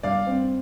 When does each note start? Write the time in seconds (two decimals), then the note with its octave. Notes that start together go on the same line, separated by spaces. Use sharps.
0.03 G2 D5 F5
0.27 C4